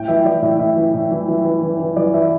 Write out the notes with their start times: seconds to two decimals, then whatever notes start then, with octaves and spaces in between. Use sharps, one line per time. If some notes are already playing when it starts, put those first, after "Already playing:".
Already playing: A2 G5
0.08 E3 E5
0.25 E3 D5
0.42 A2 E5
0.60 A2 E5
0.77 E3
0.94 A2
1.12 E3
1.28 E3
1.45 E3
1.62 E3
1.80 E3
1.96 E3 D5
2.14 E3 E5